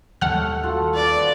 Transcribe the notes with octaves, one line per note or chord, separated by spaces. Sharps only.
D#2 G3 A3 F#5 F6
F4 F#4 A4
F3 B4 D5